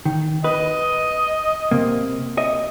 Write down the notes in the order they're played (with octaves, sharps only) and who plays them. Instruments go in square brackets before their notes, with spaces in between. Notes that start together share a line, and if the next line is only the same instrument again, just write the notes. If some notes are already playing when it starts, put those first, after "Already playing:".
[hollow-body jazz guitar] D#3
[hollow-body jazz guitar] B4 [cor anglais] D#5
[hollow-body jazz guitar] C3 A#3
D#5 E5